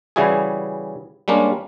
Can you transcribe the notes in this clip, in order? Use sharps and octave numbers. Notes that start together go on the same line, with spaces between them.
C#3 E3 G3 E4 F#4 G#4
G3 G#3 A#3 C#4 D4